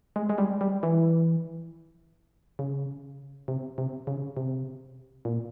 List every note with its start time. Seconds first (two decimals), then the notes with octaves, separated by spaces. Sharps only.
0.16 G#3
0.29 G#3
0.38 G3
0.61 G3
0.83 E3
2.59 C#3
3.48 C3
3.78 C3
4.07 C#3
4.37 C3
5.25 A#2